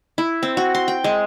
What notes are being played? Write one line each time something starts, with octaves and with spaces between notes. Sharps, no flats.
E4
C4
F#4
C6
G5
G#3